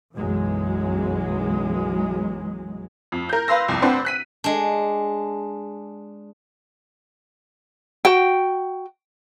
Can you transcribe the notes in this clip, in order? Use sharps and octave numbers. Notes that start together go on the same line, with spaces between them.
B1 F#2 E3 F#3 G#3
F2
A#4 G6
B4 F5 C6 E6 A#6
C2 F2
C4 D4 B4 C5 F#5
F#6 B6 D#7
G#3 D4
F#4 G5